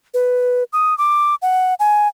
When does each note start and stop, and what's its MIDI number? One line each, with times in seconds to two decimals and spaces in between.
0.14 0.64 71
0.73 0.96 87
0.98 1.35 86
1.42 1.74 78
1.80 2.08 80